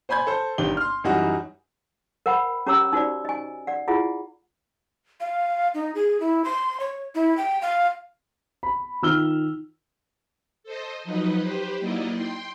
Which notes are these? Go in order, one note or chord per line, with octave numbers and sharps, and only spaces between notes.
C5 G#5 B5 G6 G#6
A4 C5 G6
G1 D#3 D4 G4 G7
C6 F6
F#2 E3 G3 D#4 F#4
A#4 C5 F#5 G5 B5
C#4 G4 C#5 A#5 D6 E6
D#4 F#4 C5 D5
D#5 G#5
D5 F#5
E4 F4 G#4 F#5
F5
D#4
G#4
E4
C6
C#5
E4
G5
F5
B5
D#3 F4 E6 F6 G7
A4 C5 D#5
F3 F#3 D#4 B4 D#5
G4 B4 C5
F#3 A#3 D#4 E4 D5 D#5
G5 C6